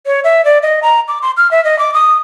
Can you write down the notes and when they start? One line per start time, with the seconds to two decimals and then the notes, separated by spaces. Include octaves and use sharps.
0.06 C#5
0.24 E5
0.45 D5
0.63 D#5
0.83 A#5
1.08 D6
1.22 C6
1.37 F6
1.51 E5
1.65 D#5
1.79 D6
1.94 D#6